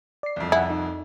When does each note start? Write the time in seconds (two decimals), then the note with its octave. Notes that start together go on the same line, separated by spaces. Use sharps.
0.23 D5 C7
0.36 C2 F2
0.52 E4 F#5 G#5
0.70 D#4